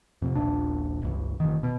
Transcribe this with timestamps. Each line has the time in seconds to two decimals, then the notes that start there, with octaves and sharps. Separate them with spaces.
0.22 F2 C3
0.35 D#1 A#1 D4
1.02 G1 C#2
1.40 F1 D#3
1.63 B2